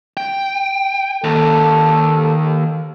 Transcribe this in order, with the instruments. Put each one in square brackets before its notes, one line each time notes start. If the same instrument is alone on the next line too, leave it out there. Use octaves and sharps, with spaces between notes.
[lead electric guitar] G5
[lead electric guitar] D#2 [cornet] A4